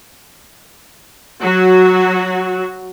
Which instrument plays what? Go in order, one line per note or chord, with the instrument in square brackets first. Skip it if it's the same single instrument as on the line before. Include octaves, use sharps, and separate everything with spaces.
[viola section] F#3 F#4